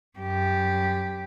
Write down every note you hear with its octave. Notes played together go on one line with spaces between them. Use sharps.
F#2 G4